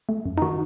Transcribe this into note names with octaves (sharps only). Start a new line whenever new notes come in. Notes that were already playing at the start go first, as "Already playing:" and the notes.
A3
F#2
D#4
D#3 F#4